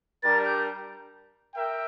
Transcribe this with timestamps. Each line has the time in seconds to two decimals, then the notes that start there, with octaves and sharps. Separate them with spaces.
0.23 G3 D4 G4 A#4 A6
0.46 G6
1.55 A#4 E5 G5